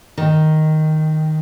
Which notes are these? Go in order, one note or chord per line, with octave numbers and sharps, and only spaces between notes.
D#3